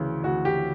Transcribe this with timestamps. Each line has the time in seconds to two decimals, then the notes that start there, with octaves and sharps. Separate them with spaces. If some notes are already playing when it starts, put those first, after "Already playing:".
Already playing: D2 C#3 E3
0.24 D2 F#4
0.45 G4